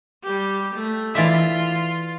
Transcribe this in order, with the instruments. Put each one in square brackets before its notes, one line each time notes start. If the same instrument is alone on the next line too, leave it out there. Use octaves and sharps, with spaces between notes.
[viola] G3 G4
A3
[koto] E3 D5 E5 [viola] F4